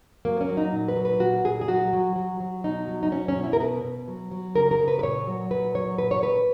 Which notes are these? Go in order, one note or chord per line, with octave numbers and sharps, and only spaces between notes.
F#3 A#3
B3
C#4
F#3
D#4
A#2
B4
F#3
B4
A#2 F#4
A#2 G#4
G#4
F#3 F#4
F#3
F#3
F#3
B2 D#4
F#3
D#4
F#3 C#4
C#4
B2
E4
A#4
B2 B4
B2
F#3
F#3
C#3 A#4
A#4
C#3
B4
B4
A#2 C#5
F#3
A#2 B4
F#3 C#5
A#2 B4
C#5
A#2 B4